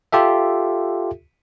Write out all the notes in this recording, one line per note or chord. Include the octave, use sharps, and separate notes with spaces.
F4 G4 A4 E5